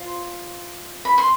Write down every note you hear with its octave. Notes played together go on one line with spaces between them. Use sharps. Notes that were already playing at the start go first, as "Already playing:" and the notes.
Already playing: F4 C5
B5
C6